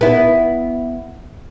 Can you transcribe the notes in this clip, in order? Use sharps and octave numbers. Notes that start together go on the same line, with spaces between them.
B3 E4